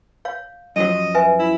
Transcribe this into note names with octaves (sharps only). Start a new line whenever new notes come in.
C#5 F5
F#2 F3 F#3 D#5
B4 E5 G#5
E4